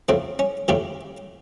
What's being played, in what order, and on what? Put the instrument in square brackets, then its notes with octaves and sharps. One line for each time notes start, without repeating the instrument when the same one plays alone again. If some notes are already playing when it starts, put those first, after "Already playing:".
[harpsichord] E2 C#3 F3 A3 C4
C#4
E2 C#3 F3 A3 G4